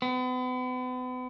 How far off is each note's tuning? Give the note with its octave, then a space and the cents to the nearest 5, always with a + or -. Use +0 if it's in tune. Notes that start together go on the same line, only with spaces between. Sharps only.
B3 +40